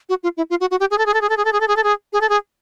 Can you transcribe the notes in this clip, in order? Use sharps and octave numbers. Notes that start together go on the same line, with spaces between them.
F#4
F4
E4
F4
F#4
F#4
G4
G#4
A4
G#4
A4
G#4
A4
G#4
A4
G#4
A4
G#4
A4
G#4
G#4
A4
G#4